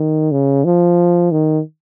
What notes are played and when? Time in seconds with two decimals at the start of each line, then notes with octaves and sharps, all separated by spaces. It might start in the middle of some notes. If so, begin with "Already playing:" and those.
Already playing: D#3
0.31 C#3
0.64 F3
1.31 D#3